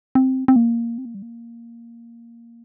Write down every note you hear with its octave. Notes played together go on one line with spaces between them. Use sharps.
C4
C4
A#3
C4
A#3
G3
A#3